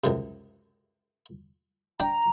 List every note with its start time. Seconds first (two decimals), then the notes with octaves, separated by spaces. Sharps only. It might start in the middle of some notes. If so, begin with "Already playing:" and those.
0.04 C#2 F#2 C3
2.00 D4 G5 A#5